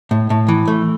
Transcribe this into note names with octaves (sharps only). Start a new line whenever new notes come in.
A2
A2
E3
A3